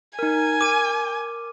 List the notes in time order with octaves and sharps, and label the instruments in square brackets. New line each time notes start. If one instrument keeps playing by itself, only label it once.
[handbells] D#4 A#4 [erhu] G#5
[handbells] A#4 [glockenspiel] D6 D#7